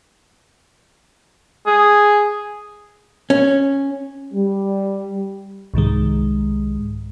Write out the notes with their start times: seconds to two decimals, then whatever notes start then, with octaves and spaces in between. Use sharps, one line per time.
1.67 G#4
3.30 C#4
4.34 G3
5.74 C2 G#2 D#3 G#3